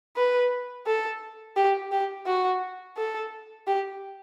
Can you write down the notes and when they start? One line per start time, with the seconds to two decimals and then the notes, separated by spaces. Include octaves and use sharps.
0.17 B4
0.86 A4
1.56 G4
1.92 G4
2.26 F#4
2.97 A4
3.67 G4